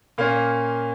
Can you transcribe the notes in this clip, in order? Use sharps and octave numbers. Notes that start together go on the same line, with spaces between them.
A#2 A#3 C#4 F5